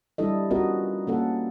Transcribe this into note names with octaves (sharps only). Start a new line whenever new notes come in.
G3 D4 E4 A4 D#5
B3 C#4 F4 F#4 A#4 D#5
A#3 C#4 A4 F#5